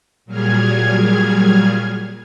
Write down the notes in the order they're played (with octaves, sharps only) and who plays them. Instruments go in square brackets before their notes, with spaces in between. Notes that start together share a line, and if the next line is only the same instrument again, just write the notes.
[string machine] A#2 F#3 G3 G#4 F6 G#6